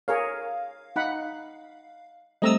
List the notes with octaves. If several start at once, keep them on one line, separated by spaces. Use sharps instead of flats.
G#4 A#4 C#5 F5
D#4 F#5 B5
G3 A3 C4 D#5 A#5 E6